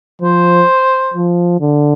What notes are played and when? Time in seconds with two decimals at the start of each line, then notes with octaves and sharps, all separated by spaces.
0.21 F3 C5
1.14 F3
1.61 D3